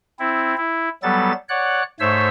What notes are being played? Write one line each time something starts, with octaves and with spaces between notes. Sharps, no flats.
C4 E4
E4
F#3 G3 B3 A4 A6
C#5 D5 F#5 F#6
G#2 A3 C5 C#5 E5 E6